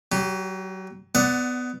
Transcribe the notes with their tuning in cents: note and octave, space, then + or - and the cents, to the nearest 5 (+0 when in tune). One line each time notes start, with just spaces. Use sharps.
F#3 +30 G4 +0
B3 +20 D5 +0 F#5 +0